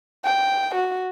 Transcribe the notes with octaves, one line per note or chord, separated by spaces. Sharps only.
G5
F#4